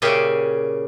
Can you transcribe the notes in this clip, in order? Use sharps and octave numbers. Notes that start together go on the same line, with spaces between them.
A#2 C#3 C#4 G4 G#4 E5